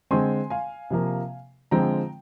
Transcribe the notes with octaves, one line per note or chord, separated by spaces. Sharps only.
D3 G#3 C4 G#5 C6
F5 G#5
C3 F3 A#3
D3 F3 G#3 C4 G5 A#5